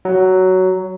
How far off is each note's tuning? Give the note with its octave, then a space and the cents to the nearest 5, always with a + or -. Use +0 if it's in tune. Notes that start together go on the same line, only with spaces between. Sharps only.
F#3 +10